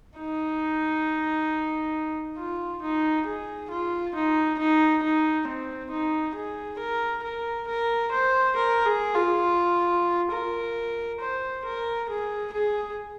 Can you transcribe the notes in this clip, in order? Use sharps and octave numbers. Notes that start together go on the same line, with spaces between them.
D#4
F4
D#4
G#4
F4
D#4
D#4
D#4
C4
D#4
G#4
A#4
A#4
A#4
C5
A#4
G#4
F4
A#4
C5
A#4
G#4
G#4